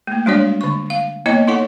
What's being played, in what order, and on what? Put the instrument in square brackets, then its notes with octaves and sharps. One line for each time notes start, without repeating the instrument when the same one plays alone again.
[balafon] A3 A#3
G3 G#3 D4 F#4 C#5 D5
D3 C#6
F5
A#3 B3 E4 C#5 D#5
D#4 E4 A4 C#5 F#5